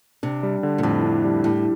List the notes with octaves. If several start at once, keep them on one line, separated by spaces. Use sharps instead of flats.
C3 D4
G3
D3
A#2
F2 A2
D4
G3
A2 G4